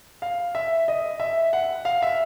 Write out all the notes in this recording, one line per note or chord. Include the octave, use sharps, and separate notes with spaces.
F5
E5
D#5
E5
F#5
F5
E5